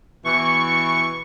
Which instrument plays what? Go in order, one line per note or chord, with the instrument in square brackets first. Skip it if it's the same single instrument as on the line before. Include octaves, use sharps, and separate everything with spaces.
[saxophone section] B2 E3 [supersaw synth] C#6